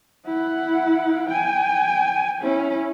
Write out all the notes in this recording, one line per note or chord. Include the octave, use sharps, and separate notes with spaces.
E4 F#5
G5 G#5
C#4 E4